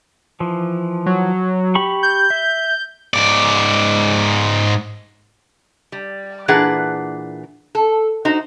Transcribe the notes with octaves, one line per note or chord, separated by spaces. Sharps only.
E3 F3
F#3
G4 B5 C#6
G6
E5
G#2 D5
G3
A#2 E3 D4 G#4 B4 F#5
A4
D#4 F#4 C5